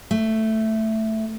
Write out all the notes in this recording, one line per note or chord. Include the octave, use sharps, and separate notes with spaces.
A3